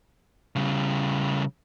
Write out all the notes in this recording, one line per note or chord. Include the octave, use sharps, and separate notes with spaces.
C#3 G3